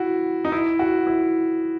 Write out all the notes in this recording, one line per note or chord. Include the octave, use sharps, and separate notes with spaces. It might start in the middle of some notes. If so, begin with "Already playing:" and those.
Already playing: E4 F#4
D#4
E4
F#4
E4